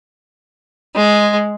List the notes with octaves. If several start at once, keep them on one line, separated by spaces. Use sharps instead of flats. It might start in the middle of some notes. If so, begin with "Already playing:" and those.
G#3